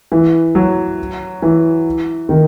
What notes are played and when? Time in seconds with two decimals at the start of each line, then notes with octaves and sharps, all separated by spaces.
0.12 E3
0.55 F#3
1.42 E3
2.29 D#3